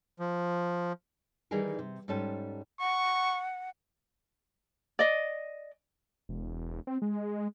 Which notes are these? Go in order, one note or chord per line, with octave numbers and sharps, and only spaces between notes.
F3
D#3 E3 G3 D#4 G#4 A#4
C3
G#2 G3 C#4 G4 A4
F#5 C#6
D5 D#5
E1
C4
G#3